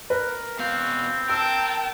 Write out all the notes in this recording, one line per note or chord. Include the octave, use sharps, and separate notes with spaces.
A#4 B4
B2 C4 F5
A#4 G5 A5 E6